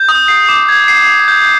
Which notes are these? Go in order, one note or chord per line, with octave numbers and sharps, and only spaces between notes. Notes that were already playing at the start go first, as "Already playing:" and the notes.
Already playing: G6
D#6
C7
D6
G#6
C7
F7
G6